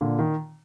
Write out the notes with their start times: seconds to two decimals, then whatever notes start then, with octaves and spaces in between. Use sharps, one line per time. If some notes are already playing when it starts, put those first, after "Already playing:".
0.01 A#2 D3
0.19 D#3